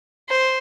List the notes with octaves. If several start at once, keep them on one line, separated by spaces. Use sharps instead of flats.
C5